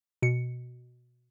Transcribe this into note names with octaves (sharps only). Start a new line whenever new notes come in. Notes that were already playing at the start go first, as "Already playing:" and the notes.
B2 C#7